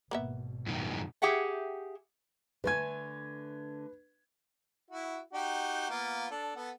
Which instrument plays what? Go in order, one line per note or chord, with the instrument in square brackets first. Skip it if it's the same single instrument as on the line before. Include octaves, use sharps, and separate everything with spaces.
[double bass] G#1 B2 [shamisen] A#3 B3 E5
[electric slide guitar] F#2 A2 D#3
[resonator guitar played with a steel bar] G4 G#4 E5 F#5 G5
[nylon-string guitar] D3 A3 G#5 [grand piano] B4 G#6
[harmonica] E4 F#4
D#4 F#4 G4
A#3 B3 F4
D4 A4
B3 A4 F#5